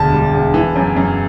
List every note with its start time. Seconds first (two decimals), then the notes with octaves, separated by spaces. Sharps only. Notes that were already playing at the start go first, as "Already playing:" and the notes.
Already playing: E1 D2 A5
0.13 G3
0.33 E1
0.54 E3
0.76 F#2
0.96 F#2